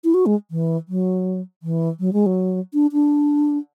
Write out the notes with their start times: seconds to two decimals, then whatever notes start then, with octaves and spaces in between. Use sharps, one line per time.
0.04 E4
0.14 F#4
0.26 G#3
0.51 E3
0.88 F#3
1.63 E3
2.00 F#3
2.13 G#3
2.26 F#3
2.74 D4
2.93 D4